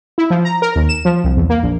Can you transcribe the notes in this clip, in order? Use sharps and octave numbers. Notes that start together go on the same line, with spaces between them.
E4
F3
A#5
A#4
D#2
E7
F3
C2
E2
A#3
A#1